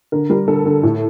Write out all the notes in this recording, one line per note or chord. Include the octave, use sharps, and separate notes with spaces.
D3 A#4
G3 A#4
D3 A4
D3
A2